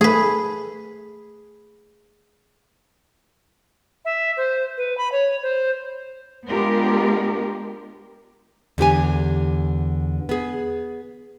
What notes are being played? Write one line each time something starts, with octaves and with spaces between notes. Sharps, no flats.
A3 G#4 B4
E5
C5
B4
B5
C#5
C5
G#3 B3 D4 F4 G4 A#4
E2 D3 G4 G#5
B3 G#4